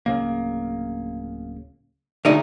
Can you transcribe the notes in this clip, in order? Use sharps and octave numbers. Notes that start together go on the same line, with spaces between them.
D1 C#3 A#3
D2 D#4 G#4 D5 E5